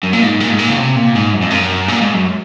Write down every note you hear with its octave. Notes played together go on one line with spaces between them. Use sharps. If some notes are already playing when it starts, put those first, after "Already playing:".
F#2
A#2
G#2
A#2
G#2
A#2
C#3
C3
A#2
G#2
F#2
F2
F#2
A#2
G#2
F#2